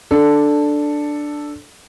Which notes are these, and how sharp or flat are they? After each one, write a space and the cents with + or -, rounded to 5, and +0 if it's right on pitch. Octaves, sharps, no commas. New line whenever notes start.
D4 +5 A4 +0